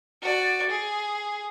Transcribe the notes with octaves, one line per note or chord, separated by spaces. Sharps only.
F#4 D5
G#4